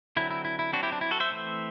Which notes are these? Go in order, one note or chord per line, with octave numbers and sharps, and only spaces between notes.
D3 F#3 C4 E4
E4
E4
E4
F#3 C4 D4 F#4
E4 G4
D4
E4
F#4 A4
C5 E5
E3 A3 C4